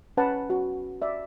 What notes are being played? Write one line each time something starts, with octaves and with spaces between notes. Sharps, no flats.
C#4 B4 F#5 A5
F#4
D5 E5